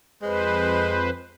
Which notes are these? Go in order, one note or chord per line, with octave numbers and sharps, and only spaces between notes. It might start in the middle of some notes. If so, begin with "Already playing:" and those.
F2 G#3 B4 C5